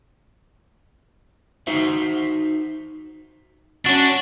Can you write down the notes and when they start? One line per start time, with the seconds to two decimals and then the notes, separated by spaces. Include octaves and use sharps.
1.67 D#4 F#4 C5 E5
3.86 C#4 D4 F#4